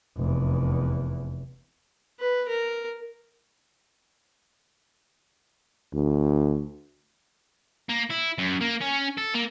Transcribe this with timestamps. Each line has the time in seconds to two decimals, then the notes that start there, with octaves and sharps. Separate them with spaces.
0.17 F1 E2
2.19 B4
2.49 A#4
5.93 D2
7.89 A#3
8.10 E4
8.38 F#2
8.61 A#3
8.81 C#4
9.17 A4
9.34 A#3